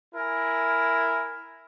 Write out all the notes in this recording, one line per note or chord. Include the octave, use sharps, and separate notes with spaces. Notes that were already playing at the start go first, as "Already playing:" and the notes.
E4 A#4 G#5